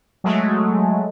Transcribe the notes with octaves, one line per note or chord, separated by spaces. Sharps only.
F#3 G#3 A3